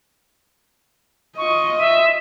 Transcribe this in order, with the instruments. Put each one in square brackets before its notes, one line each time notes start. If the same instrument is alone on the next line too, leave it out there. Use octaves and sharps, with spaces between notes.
[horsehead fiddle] F4 D#5 [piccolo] C#6
[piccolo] E5